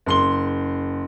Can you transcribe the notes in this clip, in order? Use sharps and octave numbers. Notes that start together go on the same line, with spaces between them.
F#1 C6 G7